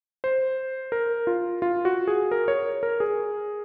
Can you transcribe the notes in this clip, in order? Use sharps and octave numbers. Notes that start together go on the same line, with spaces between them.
C5
A#4
F4
F4
F#4
G#4
A#4
C#5
A#4
G#4